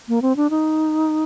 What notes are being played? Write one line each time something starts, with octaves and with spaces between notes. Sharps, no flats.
A#3
C4
D4
D#4